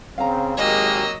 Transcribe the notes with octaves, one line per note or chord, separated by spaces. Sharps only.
C#3 C4 F5 A#5
G#1 F#3 G#3 A#3 G4 D#5 E6